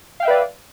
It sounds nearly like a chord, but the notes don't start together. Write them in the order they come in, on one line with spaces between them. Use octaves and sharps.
F5 G5 E5 B4 D5